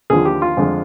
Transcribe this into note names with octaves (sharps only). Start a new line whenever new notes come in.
D#2 D3 F3 G#4
G4
F4
F2 D3 G#3